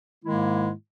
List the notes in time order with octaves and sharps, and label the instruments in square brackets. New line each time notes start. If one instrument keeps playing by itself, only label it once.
[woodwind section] G#2 D#3 G#3 A#3 E4